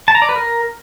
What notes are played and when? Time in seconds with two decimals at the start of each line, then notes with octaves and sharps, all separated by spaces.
0.08 A5
0.15 A#5
0.22 D5
0.29 B4
0.36 A#4